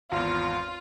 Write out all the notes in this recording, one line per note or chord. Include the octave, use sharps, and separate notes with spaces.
G#1 E2 F4